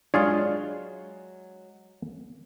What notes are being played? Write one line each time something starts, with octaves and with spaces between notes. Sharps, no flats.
F#3 G#3 D4 F4 G#4 C#5